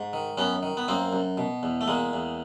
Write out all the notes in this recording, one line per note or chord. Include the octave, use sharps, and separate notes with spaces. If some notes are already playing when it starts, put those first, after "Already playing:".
Already playing: G#2
D#3
F#2 B3 C#4
D#3
B3
F#2 A#3 C4
F#2
B2
E2
A3
E2 G#3 A#3
E2